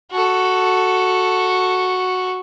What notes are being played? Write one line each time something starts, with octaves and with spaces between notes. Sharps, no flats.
F#4 A4